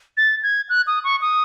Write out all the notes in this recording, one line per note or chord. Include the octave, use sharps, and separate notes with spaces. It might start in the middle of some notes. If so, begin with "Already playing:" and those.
A6
G#6
F#6
D#6
C#6
D#6